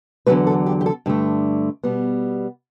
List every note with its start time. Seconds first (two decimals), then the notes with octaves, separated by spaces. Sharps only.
0.26 E2 D3 F#3 A3 B4
0.47 A4
0.66 G4
0.81 G4
0.86 A4
1.06 G2 D3 A3
1.83 B2 G3 B3